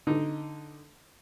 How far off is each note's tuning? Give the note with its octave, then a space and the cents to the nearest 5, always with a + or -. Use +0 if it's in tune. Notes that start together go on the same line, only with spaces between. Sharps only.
D3 +0 D#4 +0